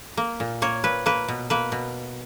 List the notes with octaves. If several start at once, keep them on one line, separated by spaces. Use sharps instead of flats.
A#3
A#2
A#3 C#5
A#2 B4
A#3 B4
B2
A#3 B4
B2